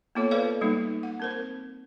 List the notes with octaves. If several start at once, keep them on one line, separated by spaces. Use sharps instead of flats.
A#3 B3 F4 A4 C#5
A4 B4 C5 D5 F5
G3 G#3 A#3 D#4
F#5
C4 A#4 C5